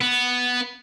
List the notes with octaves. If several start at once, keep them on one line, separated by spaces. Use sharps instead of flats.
B3